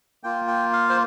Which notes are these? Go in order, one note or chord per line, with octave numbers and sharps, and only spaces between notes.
A#3 F4 G5
G5
F5
C5